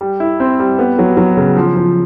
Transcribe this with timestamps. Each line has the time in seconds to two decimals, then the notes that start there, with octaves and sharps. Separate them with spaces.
0.01 G3
0.20 E4
0.40 C4
0.59 G3
0.79 B3
0.99 F#3
1.17 F#3
1.37 C#3
1.57 F3
1.77 F3